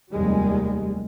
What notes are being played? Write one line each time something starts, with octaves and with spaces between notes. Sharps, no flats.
F1 D#2 G3 G#3